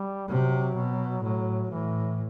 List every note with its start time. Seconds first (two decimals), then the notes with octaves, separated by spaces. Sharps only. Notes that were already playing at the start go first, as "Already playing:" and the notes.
Already playing: G3
0.29 C3 F#3
0.76 B2
1.23 A2 F#3
1.70 A2 E3